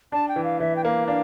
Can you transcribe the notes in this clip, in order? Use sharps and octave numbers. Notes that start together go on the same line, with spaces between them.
D4 A5
G5
E3
F5
E3 E5
G5
A#3 F5
D4 F5